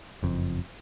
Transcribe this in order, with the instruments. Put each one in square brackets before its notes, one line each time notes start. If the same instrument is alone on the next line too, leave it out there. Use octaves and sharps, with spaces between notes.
[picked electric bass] F#1 F2